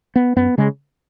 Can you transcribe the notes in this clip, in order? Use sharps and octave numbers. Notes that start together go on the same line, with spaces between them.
B3
F#2 B3
C#3 G#3